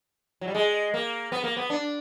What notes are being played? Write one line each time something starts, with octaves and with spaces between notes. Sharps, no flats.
F#3
G3
G#3
A#3
B3
A#3
B3
D4